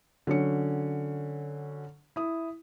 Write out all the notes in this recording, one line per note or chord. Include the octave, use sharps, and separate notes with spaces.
D3 F#3 C#4 C#7
E4 D#6